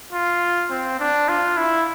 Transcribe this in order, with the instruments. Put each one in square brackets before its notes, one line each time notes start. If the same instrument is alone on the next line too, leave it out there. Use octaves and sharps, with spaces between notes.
[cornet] F4
C4
D4
F4
E4